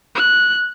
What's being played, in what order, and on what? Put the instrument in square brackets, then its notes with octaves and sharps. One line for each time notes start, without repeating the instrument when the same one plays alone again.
[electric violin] F#6